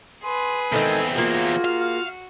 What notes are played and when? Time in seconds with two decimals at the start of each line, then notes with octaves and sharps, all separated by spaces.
0.23 G#4 B4 C6
0.72 E2 D#3 G#3 C4 A4
1.15 A#3 F4 F#4 G#4
1.65 F5